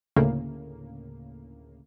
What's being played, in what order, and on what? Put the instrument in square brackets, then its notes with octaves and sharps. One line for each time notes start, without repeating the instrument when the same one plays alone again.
[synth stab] D2 A2 C#3 A#3